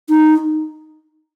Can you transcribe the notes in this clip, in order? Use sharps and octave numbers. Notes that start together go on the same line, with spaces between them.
D#4